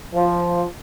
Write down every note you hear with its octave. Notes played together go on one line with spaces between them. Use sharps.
F3